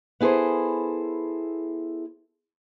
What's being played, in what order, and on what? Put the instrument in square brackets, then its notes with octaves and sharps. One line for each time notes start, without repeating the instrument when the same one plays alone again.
[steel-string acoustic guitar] B3 E4 G#4 A4 C5